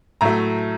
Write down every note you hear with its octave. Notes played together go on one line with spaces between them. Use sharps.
A2 F#3 A3 A#5